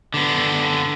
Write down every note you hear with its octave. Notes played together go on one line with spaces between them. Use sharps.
D3 B3